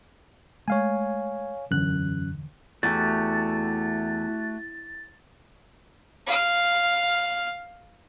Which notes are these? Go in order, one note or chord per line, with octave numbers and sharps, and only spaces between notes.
G#3 A3 C#5 F5 G#5
E1 F#2 D3 E3 F#6
E2 A3 F#4 G4 A6
F5 F6